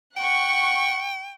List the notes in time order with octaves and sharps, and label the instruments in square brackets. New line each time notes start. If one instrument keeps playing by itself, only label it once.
[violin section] F#5 C#6 [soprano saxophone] G5